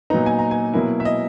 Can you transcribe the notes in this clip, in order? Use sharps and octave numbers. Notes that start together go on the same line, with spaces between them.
A#2 F#3 B3 D#4 A#5
G#5
A#5
G#5
B2 F#3 A#3 E4
E5
D#5